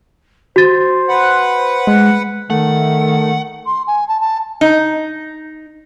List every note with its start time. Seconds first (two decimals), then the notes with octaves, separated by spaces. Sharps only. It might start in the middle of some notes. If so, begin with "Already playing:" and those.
0.56 F#4 C5 A6
1.09 B4 F#5
1.87 G#3
2.50 D#3 A3 F#5
3.66 C6
3.87 G#5
4.08 A5
4.20 A5
4.61 D#4